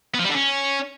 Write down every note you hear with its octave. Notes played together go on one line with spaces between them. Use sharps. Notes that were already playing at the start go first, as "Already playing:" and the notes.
B3
F3
G3
D3
C#4